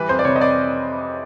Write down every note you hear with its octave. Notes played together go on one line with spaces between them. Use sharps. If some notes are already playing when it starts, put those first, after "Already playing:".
Already playing: E3 G3 B4
F2 C5
D5
C3 C#5
D#5
F2 D5